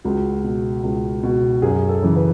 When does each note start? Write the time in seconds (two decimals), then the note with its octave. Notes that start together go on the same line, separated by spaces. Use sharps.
0.04 C#2 F#4
0.44 B2
0.83 C#2
1.23 B2
1.62 F#2 G#4
1.89 A4
2.02 C#3 E3
2.16 B4